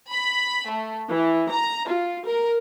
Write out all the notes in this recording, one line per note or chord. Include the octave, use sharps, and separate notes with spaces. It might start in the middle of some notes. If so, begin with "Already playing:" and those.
B5
A3
E3
A#5
F4
A#4